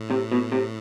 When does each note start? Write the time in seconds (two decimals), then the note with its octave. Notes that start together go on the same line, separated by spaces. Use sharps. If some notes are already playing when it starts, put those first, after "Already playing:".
Already playing: A2
0.10 C3
0.32 B2
0.52 C3